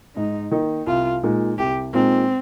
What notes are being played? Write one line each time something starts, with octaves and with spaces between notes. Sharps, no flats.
G#2 D#4
D#3 A#3 D#4
C2 F4
A#2 G#3 D#4
C2 G4
A#2 G#3 C4 D#4